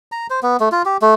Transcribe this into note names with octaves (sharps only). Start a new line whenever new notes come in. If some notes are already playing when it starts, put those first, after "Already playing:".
A#5
C5
B3
A3
F4
G4
A3